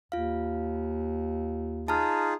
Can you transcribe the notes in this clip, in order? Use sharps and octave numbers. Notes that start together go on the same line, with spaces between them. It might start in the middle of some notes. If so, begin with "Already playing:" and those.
D#2 F4 F5
D#4 F4 G#4 A5 A#5 F6